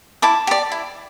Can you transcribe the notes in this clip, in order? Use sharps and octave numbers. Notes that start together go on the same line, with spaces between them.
E4 A5 D6
G4 D5
E4